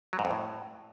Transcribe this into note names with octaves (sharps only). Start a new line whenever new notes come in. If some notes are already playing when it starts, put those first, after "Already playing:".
F#3
G#2
F2
A2